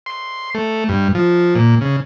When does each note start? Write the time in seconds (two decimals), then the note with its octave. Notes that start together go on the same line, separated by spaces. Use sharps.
0.06 C6
0.55 A3
0.89 G2
1.15 F3
1.55 A#2
1.81 C#3